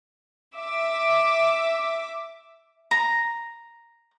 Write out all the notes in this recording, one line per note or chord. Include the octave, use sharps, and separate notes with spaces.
E5 D6
A#5